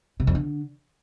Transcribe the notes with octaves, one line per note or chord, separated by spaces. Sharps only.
C3
F2
D3